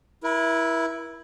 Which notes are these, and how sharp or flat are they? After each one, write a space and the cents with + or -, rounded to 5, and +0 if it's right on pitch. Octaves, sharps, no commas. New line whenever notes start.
E4 +0 A#4 +40